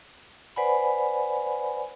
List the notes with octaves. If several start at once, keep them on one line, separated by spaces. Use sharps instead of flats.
B4 C5 D5 F#5 G#5 B5